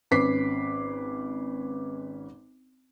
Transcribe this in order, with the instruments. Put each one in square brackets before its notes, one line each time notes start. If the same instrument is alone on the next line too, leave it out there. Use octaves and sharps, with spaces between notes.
[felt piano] G#1 C#4 B4 D6 B6 C7